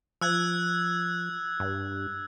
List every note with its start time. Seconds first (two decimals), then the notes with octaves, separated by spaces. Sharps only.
0.21 F3 E6 F#6 G#6
1.60 G2